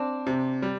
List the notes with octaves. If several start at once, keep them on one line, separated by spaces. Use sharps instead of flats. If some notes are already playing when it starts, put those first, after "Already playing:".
Already playing: C4 D4
C3
G3